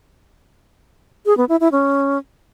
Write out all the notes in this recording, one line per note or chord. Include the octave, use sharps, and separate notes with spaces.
G#4
B3
E4
E4
C#4